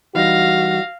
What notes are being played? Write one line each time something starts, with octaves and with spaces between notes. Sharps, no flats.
E3 G3 D#4 F#4 F5 A#6